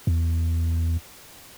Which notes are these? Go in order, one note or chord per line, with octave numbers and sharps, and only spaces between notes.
E2